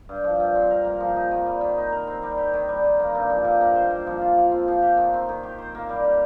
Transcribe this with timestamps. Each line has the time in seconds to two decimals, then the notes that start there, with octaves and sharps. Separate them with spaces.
0.09 G2
0.24 F3
0.40 G2
0.55 C4
0.71 A#4
0.85 A#3
1.00 F3
1.16 D#4
1.31 D#3
1.46 G3
1.61 D#3
1.77 D#4
1.92 A#4
2.07 C4
2.23 G3
2.37 G4
2.53 D#3
2.69 G3
2.84 D#3
3.00 A#3
3.15 G2
3.30 F3
3.44 G2
3.61 A#3
3.76 C5
3.91 A#3
4.07 F3
4.21 F4
4.37 F3
4.52 C4
4.68 F3
4.82 G4
4.97 D#3
5.14 C4
5.29 D#3
5.43 G4
5.59 C5
5.75 A#3
5.89 G3
6.04 G4